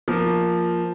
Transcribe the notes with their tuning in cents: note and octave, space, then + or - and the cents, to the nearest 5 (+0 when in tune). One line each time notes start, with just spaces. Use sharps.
F3 +0 A#3 +0